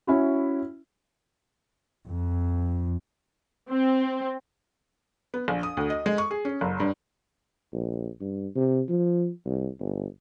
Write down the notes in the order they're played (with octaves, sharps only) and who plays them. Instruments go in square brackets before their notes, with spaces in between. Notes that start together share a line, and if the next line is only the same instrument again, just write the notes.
[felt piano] C#4 E4 F#4
[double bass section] F2
[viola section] C4
[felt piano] B3
A#1
D#6
D2
D#5
G#3
C#6
G#4
C#4
F#1
G2
[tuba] A#1
G2
C3
F3
C2
G1